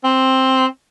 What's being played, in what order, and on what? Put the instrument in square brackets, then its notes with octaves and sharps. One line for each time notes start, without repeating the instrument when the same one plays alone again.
[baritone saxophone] C4